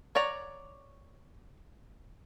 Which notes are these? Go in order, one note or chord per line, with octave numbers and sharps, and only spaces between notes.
C#5 D5 F#5 A#5